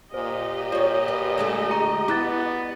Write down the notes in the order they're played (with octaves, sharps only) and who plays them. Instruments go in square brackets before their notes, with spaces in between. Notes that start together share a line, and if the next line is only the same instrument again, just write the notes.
[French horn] A#2 [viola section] G4 D#5 [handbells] C5
[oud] F4 C#5 [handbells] D5
[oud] B4
D3 G#3 A3
[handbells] G#4 A#5
[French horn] B3 [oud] E4 [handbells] D6 F#6 A6